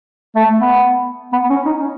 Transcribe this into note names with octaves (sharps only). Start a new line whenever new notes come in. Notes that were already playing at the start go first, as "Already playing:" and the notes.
A3
B3
B3
C#4
D#4
C#4